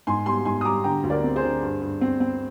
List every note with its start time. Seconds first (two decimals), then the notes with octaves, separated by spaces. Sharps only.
0.07 G#2 G#5 C6
0.26 G3 G#5 C6
0.45 G#2 G#5 C6
0.61 D#6
0.65 G3 A#5 D6
0.84 D3 G5 A#5
1.03 D2
1.10 A#4 D5
1.24 C4
1.36 G#4 C5
1.43 D3
1.62 G2
1.82 G2
2.01 C4
2.20 C4